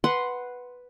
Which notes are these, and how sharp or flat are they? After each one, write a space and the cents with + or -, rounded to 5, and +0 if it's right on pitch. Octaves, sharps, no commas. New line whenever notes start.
B4 +0 F#5 +0 C6 +0